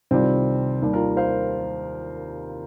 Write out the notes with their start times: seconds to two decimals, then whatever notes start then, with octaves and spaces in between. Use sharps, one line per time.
0.11 C2 C3 D#3 G3 C4 F4
0.81 D#2 D#3 G3
0.93 F4 A#4
1.17 C5 F5